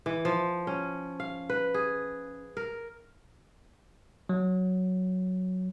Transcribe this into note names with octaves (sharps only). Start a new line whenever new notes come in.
E3
F3
C#4
F5
B4
G#4
A#4
F#3